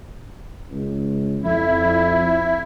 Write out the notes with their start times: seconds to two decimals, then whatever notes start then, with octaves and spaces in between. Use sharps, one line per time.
0.71 C#2
1.43 F2 E4